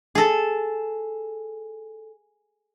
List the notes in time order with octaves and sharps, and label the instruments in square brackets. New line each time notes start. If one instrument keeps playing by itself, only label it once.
[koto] G#4 A4